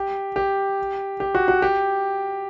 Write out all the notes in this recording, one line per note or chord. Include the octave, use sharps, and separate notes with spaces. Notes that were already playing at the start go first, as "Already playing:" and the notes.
Already playing: G4
G4
G4
F#4
F#4
G4